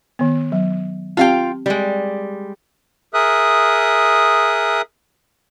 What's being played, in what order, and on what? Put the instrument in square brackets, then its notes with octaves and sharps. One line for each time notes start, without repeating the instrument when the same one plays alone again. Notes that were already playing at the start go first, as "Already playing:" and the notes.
[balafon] D#3 B3
F#3
[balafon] C4 G4 [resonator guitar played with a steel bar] F4 F5 G5
[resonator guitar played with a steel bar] G3 G#3
[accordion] G#4 A#4 E5 D#6 F#6